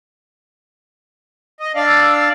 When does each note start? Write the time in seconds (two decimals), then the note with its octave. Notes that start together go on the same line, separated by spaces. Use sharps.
1.60 D#5
1.75 D4 D5 F5
1.87 E6